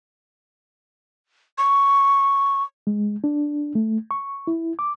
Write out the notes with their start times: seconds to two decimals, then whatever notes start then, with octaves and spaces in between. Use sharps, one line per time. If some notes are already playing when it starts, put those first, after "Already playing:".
1.58 C#6
2.87 G#3
3.24 D4
3.75 A3
4.11 C#6
4.47 E4
4.79 D6